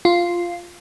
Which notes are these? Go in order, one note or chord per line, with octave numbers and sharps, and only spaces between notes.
F4